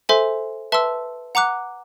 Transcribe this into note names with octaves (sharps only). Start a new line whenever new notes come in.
A4 C5 E5 G#5 C6
B4 E5 A5 C6 E6
F#5 A#5 D6 F#6